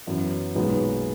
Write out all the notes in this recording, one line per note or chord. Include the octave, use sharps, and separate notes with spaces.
F#2 E3 B3
B1 A#2 G#3 B3 D#4